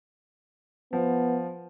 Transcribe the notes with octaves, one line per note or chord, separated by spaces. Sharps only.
F3 B3